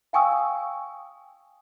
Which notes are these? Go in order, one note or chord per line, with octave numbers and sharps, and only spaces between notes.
F5 G5 G#5 C#6 D#6 E6